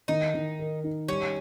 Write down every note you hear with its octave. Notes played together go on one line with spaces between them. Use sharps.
D#3 D#4
D#3
A#4
D#4
G3 C#4